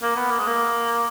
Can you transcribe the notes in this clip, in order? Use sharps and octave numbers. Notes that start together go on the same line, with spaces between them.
A#3
B3
A#3
G#3
A#3